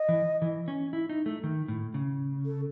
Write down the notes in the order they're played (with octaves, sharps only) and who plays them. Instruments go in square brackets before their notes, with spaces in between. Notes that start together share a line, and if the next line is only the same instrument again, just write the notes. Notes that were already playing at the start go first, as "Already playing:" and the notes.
Already playing: [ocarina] D#5
[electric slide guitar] E3
E3
C#4
E4
D#4
A3
D#3
A2
C#3
[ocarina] A4